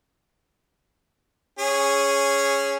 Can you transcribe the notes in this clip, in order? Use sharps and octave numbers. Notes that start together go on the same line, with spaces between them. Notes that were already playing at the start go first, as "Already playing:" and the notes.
C#4 G#4